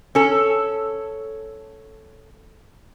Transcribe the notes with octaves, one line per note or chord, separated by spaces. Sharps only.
C#4 A4